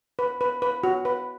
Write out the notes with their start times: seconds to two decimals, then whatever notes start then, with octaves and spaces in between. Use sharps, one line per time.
0.19 B4
0.41 B4
0.62 B4
0.84 F#4
1.05 B4